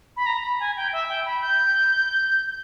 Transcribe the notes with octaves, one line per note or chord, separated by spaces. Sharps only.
B5
A#5
B5
G#5
G5
E5
G5
B5
G6